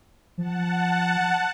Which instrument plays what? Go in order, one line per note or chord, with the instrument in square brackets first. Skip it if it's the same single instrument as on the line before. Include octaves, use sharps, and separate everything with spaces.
[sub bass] F3 [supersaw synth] F#5 A5